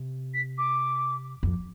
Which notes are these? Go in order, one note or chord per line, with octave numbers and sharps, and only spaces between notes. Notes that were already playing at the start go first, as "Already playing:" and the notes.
Already playing: C3
B6
D6
F2